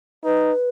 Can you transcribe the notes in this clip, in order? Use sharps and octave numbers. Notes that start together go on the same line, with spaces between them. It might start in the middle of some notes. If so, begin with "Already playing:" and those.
D#4 B4